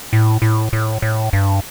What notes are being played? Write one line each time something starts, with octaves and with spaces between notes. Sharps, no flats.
A2
A2
A2
A2
G2